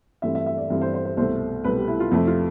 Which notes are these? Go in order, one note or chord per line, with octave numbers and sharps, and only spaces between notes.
G2 E3 A3 C4 E5
E5
E5
D5
G2 E3 A3 C4
C5
C5
C5
C2 B2 A3 C5
C2 B2 A3 B4
G4
E4
F4
F2 C3 F3 A3 A4
F4